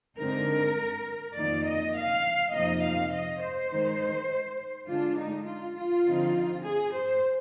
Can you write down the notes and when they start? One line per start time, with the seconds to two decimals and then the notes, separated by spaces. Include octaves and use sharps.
0.18 D3 G#3 C4 D#4 A#4
1.36 F2 D#3 A#3 D#4 D5
1.65 D#5
1.95 F5
2.53 F2 C3 F3 A#3 D#4 D#5
2.83 F5
3.13 D#5
3.42 C5
3.71 D#3 G#3 D#4
4.88 D3 G#3 D4 F4
5.18 D#4
5.47 F4
5.77 F4
6.06 D3 F3 C4 D#4
6.65 G#4
6.94 C5